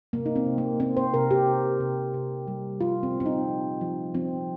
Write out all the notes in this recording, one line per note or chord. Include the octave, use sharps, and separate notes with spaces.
C3 A#3
D#4
C4
C3
A#3
A#3 C4
C5
C3 A#4
G4
C3
C3
C3
G3
F3 F4
C4
A#2
C4
D#4
F3
F3
F3 C4